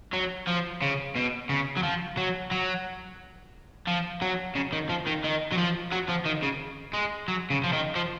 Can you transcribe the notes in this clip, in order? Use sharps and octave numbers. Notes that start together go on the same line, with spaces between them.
F#3
F3
C#3
B2
C#3
F#3
F3
F#3
F#3
F3
F#3
C#3
D#3
F3
D#3
D#3
F#3
F3
F#3
F3
D#3
C#3
G#3
F#3
C#3
F3
D#3
F3